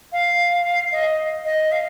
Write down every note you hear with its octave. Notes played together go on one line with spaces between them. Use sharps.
F5
D#5
D#5
F5